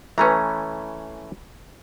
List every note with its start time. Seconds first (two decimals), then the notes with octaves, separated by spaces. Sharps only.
0.18 E3 A3 C#4 B4 A#5